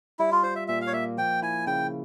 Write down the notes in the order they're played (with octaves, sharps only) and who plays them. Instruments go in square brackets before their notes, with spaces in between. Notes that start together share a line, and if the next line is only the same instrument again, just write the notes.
[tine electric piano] G3 [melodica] E4
[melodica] F4
[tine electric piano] F4 [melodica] C5
[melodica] E5
[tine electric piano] A#2 [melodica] E5
[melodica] F5
C#5
[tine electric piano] A#3 [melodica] E5
[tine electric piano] F3 [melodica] G5
[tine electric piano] E4 [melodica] G#5
[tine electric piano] C#3 [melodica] G5